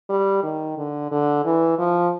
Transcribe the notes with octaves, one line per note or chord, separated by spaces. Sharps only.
G3
D#3
D3
D3
E3
F3